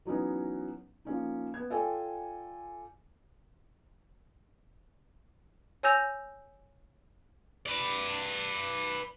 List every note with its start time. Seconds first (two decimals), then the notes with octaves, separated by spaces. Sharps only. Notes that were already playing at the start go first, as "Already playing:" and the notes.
0.05 E3 F#3 B3 C#4 D#4
1.05 F3 A#3 C#4 D#4
1.54 B3 G#6
1.70 F4 A4 D5 G5 G#5
5.83 C#5 G#5 E6 G6 A#6 F7
7.66 B4 D5